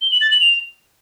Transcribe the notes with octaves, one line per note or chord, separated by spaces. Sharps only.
G7
F#7
A6
F#7
F7